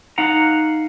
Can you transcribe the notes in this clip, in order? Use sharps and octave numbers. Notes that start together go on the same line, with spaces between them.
D#4 F5 F#5 A#5